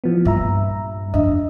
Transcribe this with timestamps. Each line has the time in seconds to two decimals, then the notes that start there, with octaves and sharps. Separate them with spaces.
0.04 E3 F3 B3
0.25 G2 A#2 E5 A#5
1.14 F2 D4 D#5 E5